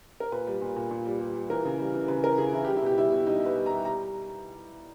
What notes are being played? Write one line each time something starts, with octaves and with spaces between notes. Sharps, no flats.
A#4
A#2 B4
G3
A#2
A#2
A#2
G3
G3
G3
E3 A#4
C#3
G3
E3
C#3 B4
E3 A#4
C#3 G#4
E3 E4
G3 G4
E4
B2 G4
G3 E4
B2
G3 D#4
G3 B4
G3
A#5
G3
G3 A#5